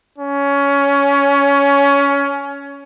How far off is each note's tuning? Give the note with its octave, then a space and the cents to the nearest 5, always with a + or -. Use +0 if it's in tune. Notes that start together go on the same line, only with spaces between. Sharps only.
C#4 +15